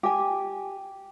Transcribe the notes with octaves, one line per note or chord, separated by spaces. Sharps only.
G4 G#5